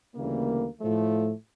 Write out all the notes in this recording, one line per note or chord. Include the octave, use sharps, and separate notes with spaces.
D2 C#3 E3 G3 A#3
A2 F3 A3